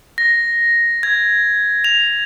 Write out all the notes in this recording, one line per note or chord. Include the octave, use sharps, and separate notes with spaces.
A#6
G#6
F7